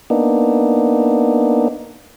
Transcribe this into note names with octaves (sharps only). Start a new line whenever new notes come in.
A#3 B3 D4 D#4